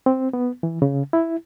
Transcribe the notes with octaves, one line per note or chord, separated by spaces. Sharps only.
C4
B3
E3
C#3
E4